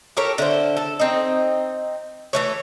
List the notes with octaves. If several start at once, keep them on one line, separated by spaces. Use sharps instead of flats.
G4 A4 A#4 C#5
D3 E4 C5
A4
C4 D#4
E3 A3 C#5